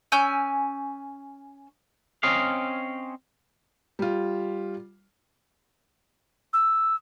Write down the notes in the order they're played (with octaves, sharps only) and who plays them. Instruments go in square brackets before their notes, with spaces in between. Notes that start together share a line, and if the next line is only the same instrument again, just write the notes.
[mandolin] C#4 G#5 E6 G6
[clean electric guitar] C4 C#4 D#5 F5
[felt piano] G3 F4
[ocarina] E6